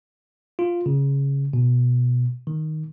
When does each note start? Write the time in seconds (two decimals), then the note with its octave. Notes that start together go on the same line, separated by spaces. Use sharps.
0.59 F4
0.86 C#3
1.53 B2
2.47 D#3